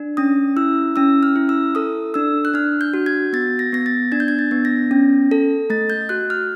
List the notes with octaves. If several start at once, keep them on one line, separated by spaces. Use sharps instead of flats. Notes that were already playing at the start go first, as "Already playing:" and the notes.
Already playing: D4
C#4 D#6
E4 E6
C#4 E6
F6
E4
E6
A4 D#6
D4 E6
F#6
D4 F6
G6
F#4
G#6
B3 A6
A#6
B3 A#6
A6
D4 G#6
G6
G#6
A6
B3
A#6
C#4
A4
A3 A6
G6
F#4 F#6
F6